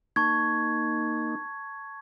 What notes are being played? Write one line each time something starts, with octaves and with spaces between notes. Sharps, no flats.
A#3 D#4 A5 C#6 G#6